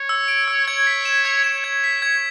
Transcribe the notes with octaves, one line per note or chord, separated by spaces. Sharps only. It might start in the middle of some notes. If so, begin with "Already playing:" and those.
Already playing: C#5
E6
D7
E6
C#5 G#6
B6
E7
G#6
C#5 E7
G#6
B6
G#6